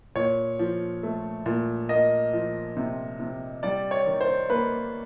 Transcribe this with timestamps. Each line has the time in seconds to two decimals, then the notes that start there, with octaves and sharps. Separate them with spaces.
0.16 A#2 C#5
0.59 F3
1.03 A3
1.46 A#2
1.89 A#3 D#5
2.33 F3
2.77 C3
3.20 C3
3.63 G3 D5
3.91 C#5
4.06 D#3
4.21 C5
4.50 A#3 B4